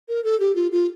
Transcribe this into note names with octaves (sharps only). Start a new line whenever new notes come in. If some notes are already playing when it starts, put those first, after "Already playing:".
A#4
A4
G4
F4
F4